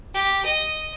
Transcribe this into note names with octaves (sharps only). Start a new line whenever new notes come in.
G4
D#5